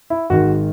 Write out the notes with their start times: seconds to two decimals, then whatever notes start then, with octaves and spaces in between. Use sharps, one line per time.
0.10 E4
0.30 G#1 G#2 D#3 F#4